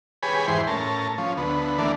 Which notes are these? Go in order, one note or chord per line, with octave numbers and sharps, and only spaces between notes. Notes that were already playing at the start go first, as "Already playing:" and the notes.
G4 G#4 B4 C#5 G#5 B5
E2 G#2 E3 C5 G5 C6
A2 C#4 A#4 A5
F3 C#4
D2 B3
D3 E3 A3 A#3 D4